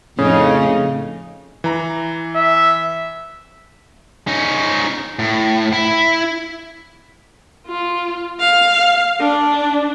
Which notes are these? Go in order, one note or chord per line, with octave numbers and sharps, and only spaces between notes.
F2 A2 C#3 D#4
E3 A#5
E5
C#4 D#4
A2
E4
F4
F5
D4